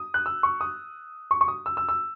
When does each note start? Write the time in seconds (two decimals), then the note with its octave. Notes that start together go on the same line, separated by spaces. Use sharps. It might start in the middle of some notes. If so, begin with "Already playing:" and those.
Already playing: D#6
0.14 F#6
0.26 E6
0.43 C#6
0.61 D#6
1.31 C#6
1.41 C#6
1.48 D#6
1.66 E6
1.77 E6
1.89 E6